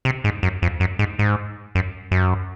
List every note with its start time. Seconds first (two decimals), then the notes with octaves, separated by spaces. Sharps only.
0.05 C3
0.24 G#2
0.43 F#2
0.62 F2
0.80 F#2
0.99 G#2
1.19 G#2
1.75 F#2
2.11 F#2